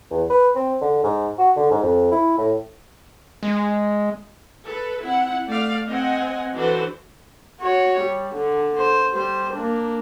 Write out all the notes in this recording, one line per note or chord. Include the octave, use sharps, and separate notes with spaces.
E2
B4
C4
D3
G#2
F#4
D3
G#2
F2
E4
A2
G#3
A4 B4
C4 E4 F#5
A3 D5 F5
C4 D#5 F#5 G#5
E3 D4 F#4 A4 B4 C5
F#4 C#5
G3
D3
C5
G3 C5
A#3 D4